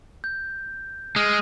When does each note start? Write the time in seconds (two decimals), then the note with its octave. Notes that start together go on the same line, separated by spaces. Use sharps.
0.24 G6
1.16 G#3 D#6 F6 D#7